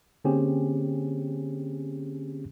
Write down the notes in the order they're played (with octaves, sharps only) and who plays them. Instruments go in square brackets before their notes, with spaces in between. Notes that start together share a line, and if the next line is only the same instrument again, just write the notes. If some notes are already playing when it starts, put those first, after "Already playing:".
[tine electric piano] D3 A#3 C4 C#4 G4 G#4